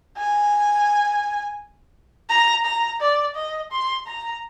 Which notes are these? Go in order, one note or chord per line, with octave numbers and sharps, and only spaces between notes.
G#5
A#5
A#5
D5
D#5
C6
A#5